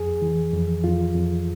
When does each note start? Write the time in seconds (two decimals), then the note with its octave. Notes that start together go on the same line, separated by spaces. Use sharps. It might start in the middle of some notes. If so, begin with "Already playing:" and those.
Already playing: F2 G#4
0.22 E3
0.53 F2
0.84 F2 F4
1.15 F2